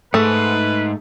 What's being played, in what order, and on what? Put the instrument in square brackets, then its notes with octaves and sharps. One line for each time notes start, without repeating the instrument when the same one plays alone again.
[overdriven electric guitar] G#2 [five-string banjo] A3 [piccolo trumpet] B4